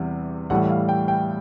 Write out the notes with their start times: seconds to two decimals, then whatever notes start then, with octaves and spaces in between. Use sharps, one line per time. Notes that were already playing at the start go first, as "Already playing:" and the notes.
Already playing: E2 C3 E3 G3
0.50 A2 E3 G3 F#5
0.70 F5
0.89 G5
1.08 G5